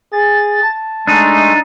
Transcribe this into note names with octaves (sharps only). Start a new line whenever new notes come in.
G#4 A6
A5
G#3 A3 D4 D#4